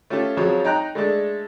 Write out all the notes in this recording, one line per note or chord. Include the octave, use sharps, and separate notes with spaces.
A3 C#4 F4 G4 A4
F2 F3 F#3 G#4 C#5
D#4 G5 A#5 F#6
G#3 A3 D4 G#4 A4